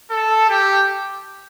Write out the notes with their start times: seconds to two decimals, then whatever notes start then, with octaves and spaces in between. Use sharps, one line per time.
0.10 A4
0.49 G4